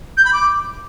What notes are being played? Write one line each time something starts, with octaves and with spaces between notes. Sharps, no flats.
G6
B5
D6